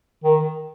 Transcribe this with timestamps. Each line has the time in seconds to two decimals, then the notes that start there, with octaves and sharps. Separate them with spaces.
0.24 D#3